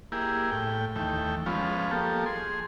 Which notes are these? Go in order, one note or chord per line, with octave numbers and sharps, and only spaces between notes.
A#3 E4 G4 G#4
A2 G5
D#2 E3 A3 G5
F3 G#3 B3 C#4 F4
F3 A#3 G4 A4
G#4 C6